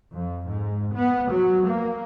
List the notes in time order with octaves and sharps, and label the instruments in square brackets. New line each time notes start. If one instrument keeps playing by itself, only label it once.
[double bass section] F2
G#2
B3
F#3
A#3